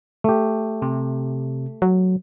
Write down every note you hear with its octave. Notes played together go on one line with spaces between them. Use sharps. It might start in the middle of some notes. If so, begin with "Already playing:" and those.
A3 G4
C3
F#3